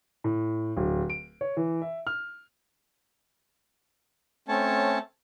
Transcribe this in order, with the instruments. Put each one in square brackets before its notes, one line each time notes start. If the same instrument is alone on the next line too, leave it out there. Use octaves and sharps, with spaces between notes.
[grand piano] A2
D1
D7
C#5
E3
E5
F6
[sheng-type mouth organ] A3 C4 C#4 C#5 A5